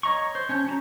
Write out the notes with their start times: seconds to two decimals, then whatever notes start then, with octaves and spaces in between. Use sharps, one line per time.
0.03 C#5 D#5 A#5 C#6
0.35 C5
0.49 C#4 C#5 A5 G6
0.66 C#4 F#4 A5 A#5